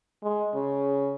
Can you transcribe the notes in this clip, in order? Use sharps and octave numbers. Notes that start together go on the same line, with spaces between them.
G#3
C#3